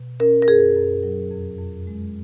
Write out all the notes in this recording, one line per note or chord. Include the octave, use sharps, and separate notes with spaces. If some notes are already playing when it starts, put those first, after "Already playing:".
Already playing: B2
C#4 A#4
A#4
F#2 G#4
F#2
F#3
F2
F2
G#3